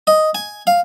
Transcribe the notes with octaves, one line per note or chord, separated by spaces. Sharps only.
D#5
G#5
F5